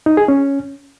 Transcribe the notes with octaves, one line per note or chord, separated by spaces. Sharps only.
D#4
G#4
C#4